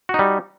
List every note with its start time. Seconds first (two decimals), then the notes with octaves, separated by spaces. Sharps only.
0.09 F#4
0.14 D#4
0.19 G3